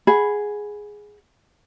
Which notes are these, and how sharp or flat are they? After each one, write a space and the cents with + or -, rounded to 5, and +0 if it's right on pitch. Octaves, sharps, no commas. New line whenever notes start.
G#4 +0 F#5 +5 B5 +0